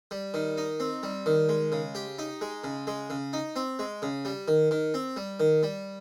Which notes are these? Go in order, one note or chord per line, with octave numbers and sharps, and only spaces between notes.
G3
D#3
D#4
C4
G3
D#3
G#3
C#3
G4
D#4
G#3
C#3
G#3
C#3
D#4
C4
G#3
C#3
G3
D#3
D#3
C4
G3
D#3
G3